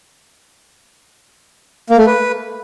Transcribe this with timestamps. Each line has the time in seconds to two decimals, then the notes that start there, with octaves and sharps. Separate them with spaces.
1.90 A#3
1.98 A3
2.06 B4